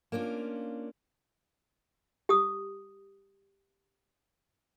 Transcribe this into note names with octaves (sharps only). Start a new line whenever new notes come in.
A#3 C#4 D4 F4
G4 D#6